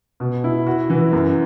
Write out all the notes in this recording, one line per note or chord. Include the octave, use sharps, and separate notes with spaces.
B2
E4
F#4
E3
F#2